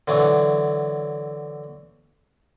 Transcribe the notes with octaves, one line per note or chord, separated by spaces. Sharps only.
D3 E3 F#3